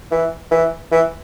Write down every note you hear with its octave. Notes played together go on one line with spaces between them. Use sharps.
E3
E3
E3